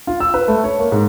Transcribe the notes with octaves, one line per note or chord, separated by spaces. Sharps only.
F4
E6
B4
A3
C#5
A#3
G#2